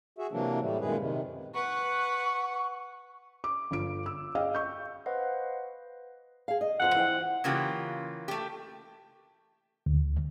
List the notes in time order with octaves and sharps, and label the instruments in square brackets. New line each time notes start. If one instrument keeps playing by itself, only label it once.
[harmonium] F#4 G#4 E5
C3 E3 F#3 A#3 D4
A2 G3 A3
F#2 A#2 D#3 G#3 G#4 B4
C3 D#3
[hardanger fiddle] B4 F#5 [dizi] C#6
[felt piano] D6
G1 F4 D7
E6
G#4 D#5 F5 G5
C#6 G6
[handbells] B4 C5 D#5 F5 F#5
[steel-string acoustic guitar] G#4 F5
D#5
[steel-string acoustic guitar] F2 F3 C5 [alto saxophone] F#5
[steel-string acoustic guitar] E3 C5 G5
[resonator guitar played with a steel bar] C#3 E3 A#3 F4 G4
A3 G4
[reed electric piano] D2